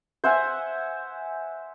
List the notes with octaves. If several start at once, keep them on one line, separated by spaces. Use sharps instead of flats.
C5 E5 F#5 G#5